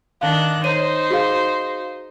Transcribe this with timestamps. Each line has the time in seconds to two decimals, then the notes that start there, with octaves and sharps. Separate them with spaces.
0.21 D#3 D4 F5 F#6
0.64 D#4 C5 C#5 D#7
1.11 F#4 G#4 F5